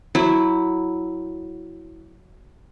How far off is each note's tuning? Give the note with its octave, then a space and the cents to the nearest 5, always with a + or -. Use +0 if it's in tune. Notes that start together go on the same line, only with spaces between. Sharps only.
F#3 +0 E4 -5